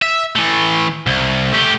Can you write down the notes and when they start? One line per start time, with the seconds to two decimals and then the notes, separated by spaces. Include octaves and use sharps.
0.02 E5
0.36 E3 A3
1.07 C2
1.53 A3 G4